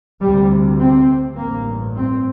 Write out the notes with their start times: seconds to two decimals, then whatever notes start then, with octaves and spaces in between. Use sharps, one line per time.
0.21 D2 C3 G3
0.79 C4
1.37 A1 G2 A#3
1.96 C4